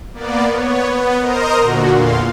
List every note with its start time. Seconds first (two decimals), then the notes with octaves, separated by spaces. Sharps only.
0.13 A#3 B3 D5
0.51 B3 C#5
0.90 B3
1.20 A#4 C5 D#5 A#5 D#6
1.59 A#2 D3 F#4
1.91 E2 A#2 F5 C6